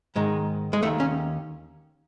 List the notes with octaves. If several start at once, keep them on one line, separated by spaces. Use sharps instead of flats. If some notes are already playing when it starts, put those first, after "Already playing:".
G#2 D#3 G#3
G#3
D#2 D#3 A3
C#4